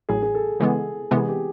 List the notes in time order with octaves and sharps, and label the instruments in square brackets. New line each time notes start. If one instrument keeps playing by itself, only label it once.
[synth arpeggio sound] A1 A2 F#3 [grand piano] G#4
[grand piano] G#4
A4
[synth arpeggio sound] C#3 E3 G#3 B3 [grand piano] G#4
[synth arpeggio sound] C3 E3 G#3 B3
[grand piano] G#4
G4